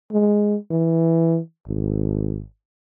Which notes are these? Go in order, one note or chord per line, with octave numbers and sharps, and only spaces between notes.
G#3
E3
G#1